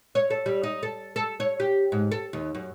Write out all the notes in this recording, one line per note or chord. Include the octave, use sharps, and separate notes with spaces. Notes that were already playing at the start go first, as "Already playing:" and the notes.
C#5
A4
G3
D#4
A4
A4
C#5
G4
G#2
A4
D#2
F#2